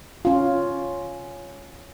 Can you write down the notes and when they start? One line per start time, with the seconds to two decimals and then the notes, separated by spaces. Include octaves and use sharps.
0.25 C#4 F4